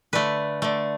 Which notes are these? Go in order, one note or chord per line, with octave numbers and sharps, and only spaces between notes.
D3 A3 B4
D3 A3